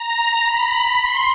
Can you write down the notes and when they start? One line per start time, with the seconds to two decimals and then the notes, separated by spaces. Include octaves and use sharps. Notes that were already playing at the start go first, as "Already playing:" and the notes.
Already playing: A#5
0.48 B5
1.02 C6